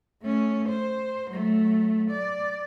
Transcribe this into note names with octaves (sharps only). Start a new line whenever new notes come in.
A3 C#4
C5
F#3 A3
D5